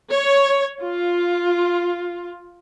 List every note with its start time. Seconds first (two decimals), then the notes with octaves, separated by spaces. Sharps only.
0.12 C#5
0.81 F4